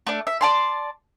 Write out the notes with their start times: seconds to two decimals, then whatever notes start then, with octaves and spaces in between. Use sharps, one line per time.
0.07 A3 D4
0.27 E5
0.41 D5 A5 C6